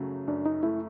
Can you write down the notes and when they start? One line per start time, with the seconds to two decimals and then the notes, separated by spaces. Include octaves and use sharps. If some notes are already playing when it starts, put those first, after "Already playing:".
Already playing: F#2 C#3 F#3 A3
0.27 F#2 D4
0.46 D#4
0.63 A3 E4